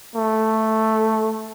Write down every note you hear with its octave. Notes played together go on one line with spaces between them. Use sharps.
A3